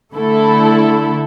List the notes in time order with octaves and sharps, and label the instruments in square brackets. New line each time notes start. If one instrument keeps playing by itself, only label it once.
[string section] D3 A3 E4 A4